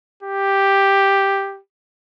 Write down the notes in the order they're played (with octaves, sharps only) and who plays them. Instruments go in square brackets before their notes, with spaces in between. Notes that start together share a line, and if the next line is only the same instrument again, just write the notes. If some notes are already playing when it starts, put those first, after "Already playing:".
[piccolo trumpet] G4